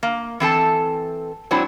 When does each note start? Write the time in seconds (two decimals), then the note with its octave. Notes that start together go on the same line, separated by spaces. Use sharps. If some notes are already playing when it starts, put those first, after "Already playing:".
0.03 A#3
0.40 E3 C4 A4 A5
1.51 F#3 G#3 C4 D4 E4